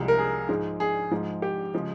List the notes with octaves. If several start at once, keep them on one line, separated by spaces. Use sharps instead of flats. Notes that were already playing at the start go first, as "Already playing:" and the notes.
Already playing: C2 C3 F3 G#3
A#4
G#4
G#2 F3 G#3
G#4
G#2 F3 G#3
G4
C#3 F3 G#3